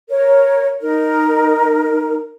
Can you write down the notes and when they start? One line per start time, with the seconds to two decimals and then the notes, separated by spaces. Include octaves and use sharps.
0.10 A#4 C#5
0.80 D#4 A#4